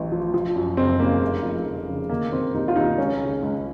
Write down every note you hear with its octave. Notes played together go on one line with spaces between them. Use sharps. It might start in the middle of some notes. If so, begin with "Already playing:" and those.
Already playing: A1 A2
F3
F3
F#2
F#1 C4
C#3 A#3
F1
F2
F1
C#3
D#3 A#3
D#3 C4
D#2 D#4
F4
D#2 D#4
C#2 C#4
C#3
C#2